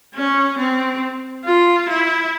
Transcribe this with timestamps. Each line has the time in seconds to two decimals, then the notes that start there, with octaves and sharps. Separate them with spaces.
0.14 C#4
0.58 C4
1.45 F4
1.88 E4